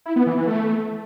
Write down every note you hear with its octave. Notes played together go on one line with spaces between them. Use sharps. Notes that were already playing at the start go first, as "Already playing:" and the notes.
E4
B3
E3
E3
A3